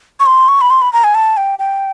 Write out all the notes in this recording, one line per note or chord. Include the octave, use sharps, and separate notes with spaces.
C#6
C6
C#6
B5
C6
B5
A#5
G#5
A5
G5
G5